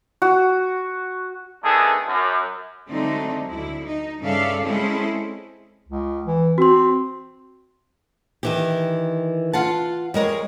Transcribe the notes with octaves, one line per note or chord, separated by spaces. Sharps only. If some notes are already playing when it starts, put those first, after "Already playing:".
F#4
D#3 A3 B3 D4 G#4 A4
F#2
D3 F#3 G#3 A3 C4 D#4
D2 E4
D#4
G2 C#3 A4 D5 E5 F5
G#3 C4 C#4 E4 G#4 A4
C#2
E3
C4 F#4 C6
D#3 E3 G4
F4 F#5 A5
G3 G#3 A#4 C#5